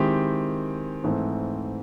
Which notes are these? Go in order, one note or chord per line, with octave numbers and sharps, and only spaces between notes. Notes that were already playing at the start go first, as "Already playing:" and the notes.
Already playing: D#3 G#3 C4 E4 G4
G#2 E3 A3 C4